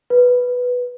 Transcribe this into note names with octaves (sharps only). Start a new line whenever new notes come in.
B4